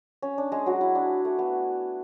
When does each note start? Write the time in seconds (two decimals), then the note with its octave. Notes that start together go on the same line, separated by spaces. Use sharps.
0.22 C#4
0.38 D4
0.52 G#3 G#4
0.66 F#3 F#4
0.81 E4
0.95 D4
1.25 A3
1.39 B3